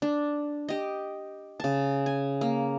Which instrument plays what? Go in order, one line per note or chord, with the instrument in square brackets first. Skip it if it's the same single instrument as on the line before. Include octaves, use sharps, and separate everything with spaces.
[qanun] D4
G4 D#5
C#3 A5
G#5
A#3